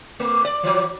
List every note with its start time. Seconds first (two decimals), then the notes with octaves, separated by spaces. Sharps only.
0.20 A3
0.45 D5
0.63 E3 F#3